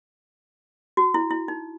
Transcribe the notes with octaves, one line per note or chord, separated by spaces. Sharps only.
F#4
E4
E4
D#4